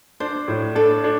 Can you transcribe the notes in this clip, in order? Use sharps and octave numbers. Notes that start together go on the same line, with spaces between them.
D4 C5
A2
D4 A4
D4